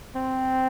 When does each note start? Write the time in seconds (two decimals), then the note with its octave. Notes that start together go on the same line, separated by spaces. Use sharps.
0.15 C4